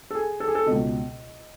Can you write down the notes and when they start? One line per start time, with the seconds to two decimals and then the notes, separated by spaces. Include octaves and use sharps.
0.11 A4
0.15 G#4
0.40 A4
0.48 G#4
0.55 A4
0.66 C#2 B2 D#5